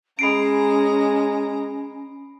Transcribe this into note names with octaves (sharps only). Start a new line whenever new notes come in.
G#3 C#4 A#5 B5 C7 D7